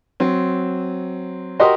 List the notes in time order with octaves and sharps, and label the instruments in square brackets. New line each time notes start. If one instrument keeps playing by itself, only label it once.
[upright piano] F#3 C4
[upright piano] F#4 G4 A#4 [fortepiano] D#5 C6